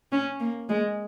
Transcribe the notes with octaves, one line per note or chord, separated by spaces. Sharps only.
C#4
A#3
G#3